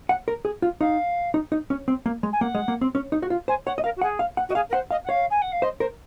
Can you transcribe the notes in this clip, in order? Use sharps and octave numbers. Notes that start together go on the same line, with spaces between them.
F#5
A#4
G#4
F4
D#4 F5
D#4
D#4
C#4
C4
A#3
G#3
G#5
A#3 F#5
G#3
A#3
C4
C#4
D#4
F#4
F4
C5 G#5
C#5 F#5
D#5
A#4 F5
F#4
G#4 F#5
F5
F#5
F#4 D#5
G#4 F5
A#4
C5 F#5
D#5 F5
F#5
C#5 F5
G#5
F#5
F5
C5 D#5
A#4 C5